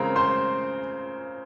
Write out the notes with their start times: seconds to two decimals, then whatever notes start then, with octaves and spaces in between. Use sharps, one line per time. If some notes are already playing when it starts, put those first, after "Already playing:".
Already playing: C#3 G#3 C4 F4 A#4 A#5
0.16 C5 C6